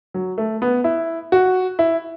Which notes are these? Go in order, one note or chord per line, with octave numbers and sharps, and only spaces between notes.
F#3
A3
B3
E4
F#4
E4